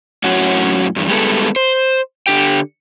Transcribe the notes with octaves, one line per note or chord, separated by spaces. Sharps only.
F#2 A2 F#3 C#4 F#4
E2 G2
G3 G#3 B3 A4
C5
D3 G4 G5